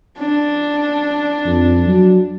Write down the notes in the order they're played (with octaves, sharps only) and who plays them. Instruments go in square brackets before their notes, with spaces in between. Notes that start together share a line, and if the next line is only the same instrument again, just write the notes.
[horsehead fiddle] D4
[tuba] F2
F#3